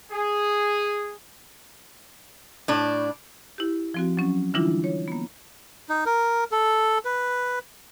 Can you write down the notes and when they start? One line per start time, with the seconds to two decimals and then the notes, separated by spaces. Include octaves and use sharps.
0.11 G#4
2.68 A2 D4
3.58 E4 G4
3.94 F3 C4 F#4
4.17 F#3 C#4
4.54 D3 E3 G3 D4 E4 F4
4.84 C#5
5.08 A#3 B3
5.89 D#4
6.06 A#4
6.52 A4
7.05 B4